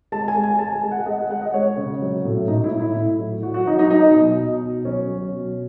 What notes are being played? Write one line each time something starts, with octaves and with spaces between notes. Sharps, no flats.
G#3 A5
G#5
G#3
G#5
G#3 A5
G#5
G#3
F#5
G#3 D#5
F#5
G#3 F#5
D#5
G#3 C#5
C#3
F#3
A2
A2 D#4
E4
A2
E4
A2
F#3
F#3 F#4
F#4
F#3 D#4
D#4
F#3 D#4
B2
B2
B2
F#3 C#4
F#3
B2